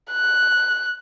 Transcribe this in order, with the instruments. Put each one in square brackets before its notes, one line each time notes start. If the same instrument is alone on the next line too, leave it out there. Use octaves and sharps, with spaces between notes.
[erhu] F#6